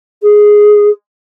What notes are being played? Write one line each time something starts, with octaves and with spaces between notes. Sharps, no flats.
G#4